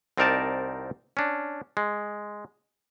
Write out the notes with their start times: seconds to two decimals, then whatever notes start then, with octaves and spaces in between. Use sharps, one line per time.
0.17 C2 C4 D#4 A#4 D5 A5
1.17 C#4 D4
1.77 G#3